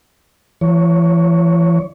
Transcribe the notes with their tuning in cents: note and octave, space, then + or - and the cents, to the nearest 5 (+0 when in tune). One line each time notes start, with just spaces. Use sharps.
E3 +40 C#5 +15